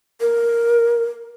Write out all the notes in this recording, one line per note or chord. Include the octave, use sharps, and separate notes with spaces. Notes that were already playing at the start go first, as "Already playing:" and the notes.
A#4